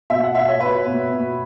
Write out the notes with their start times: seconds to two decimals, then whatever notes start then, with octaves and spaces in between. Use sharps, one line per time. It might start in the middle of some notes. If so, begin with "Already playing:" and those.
0.10 B2 E5
0.23 F#5
0.35 B2 E5
0.48 C#5
0.60 B2 B4
0.86 B2
1.11 B2